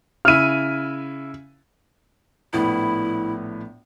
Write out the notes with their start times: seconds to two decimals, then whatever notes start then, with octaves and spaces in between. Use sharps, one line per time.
0.25 C#3 E4 F6 D#7
2.53 A#1 A2 B3 E4